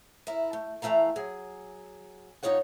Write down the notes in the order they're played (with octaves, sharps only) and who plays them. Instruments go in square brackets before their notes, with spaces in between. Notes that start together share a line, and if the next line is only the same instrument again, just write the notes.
[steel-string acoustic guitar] E4 A#4 E5
A3
E3 A3 E4 F5 A#5
F#3 G#4
G2 G3 D#4 F4 C#5 F#5